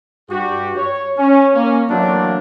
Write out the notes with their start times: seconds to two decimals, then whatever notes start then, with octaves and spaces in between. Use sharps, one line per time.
0.30 G2 F#4 G4
0.77 C#5
1.17 C#4
1.55 A#3 C#4
1.90 E3 F#3 A3 A#3 C4 D4